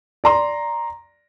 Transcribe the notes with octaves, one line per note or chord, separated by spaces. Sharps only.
D5 A#5 C6